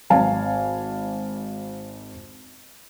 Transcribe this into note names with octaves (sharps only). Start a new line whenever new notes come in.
G#1 F5 G#5 A5